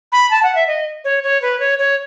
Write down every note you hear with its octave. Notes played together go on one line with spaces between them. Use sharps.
B5
A5
F#5
E5
D#5
C#5
C#5
B4
C#5
C#5